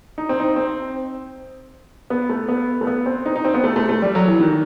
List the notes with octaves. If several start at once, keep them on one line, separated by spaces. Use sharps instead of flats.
D#4
C4
D#4
C4
B3
A3
B3
A3
B3
C4
D#4
D#4
C4
B3
A3
A3
A3
G3
F#3
E3
D#3